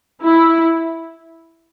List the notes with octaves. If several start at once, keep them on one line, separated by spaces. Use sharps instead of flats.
E4